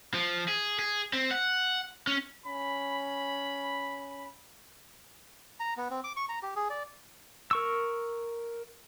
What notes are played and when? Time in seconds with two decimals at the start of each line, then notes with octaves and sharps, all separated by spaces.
0.14 F3
0.48 G#4
0.79 G#4
1.13 C4
1.31 F#5
2.07 C#4
2.47 C#4 B5
5.60 A#5
5.77 B3
5.90 C4
6.04 D6
6.17 C#6
6.29 A#5
6.43 G4
6.56 G#4
6.70 D5
7.51 A#4 C#6 E6